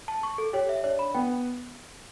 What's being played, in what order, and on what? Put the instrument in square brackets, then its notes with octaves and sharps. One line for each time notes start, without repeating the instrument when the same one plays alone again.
[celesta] A5
C#6
A4
[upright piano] G4 [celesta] C#5
[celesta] E5
[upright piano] D4 [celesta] C#5
[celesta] B5
[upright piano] B3 [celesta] G5